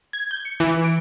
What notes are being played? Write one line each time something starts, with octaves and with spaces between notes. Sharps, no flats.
G#6
G6
C#7
E3
D7